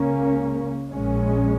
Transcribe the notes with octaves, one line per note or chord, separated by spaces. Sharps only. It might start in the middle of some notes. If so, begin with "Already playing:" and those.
Already playing: C#2 C#3 A#3 C#4
A#1 A#2 G#3 C#4